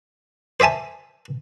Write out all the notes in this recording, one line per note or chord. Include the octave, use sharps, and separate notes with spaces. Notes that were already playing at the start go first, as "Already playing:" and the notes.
C5 D5 E5 G#5 A5